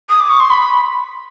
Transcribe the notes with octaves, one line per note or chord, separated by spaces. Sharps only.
D#6
D6
C#6
C6
B5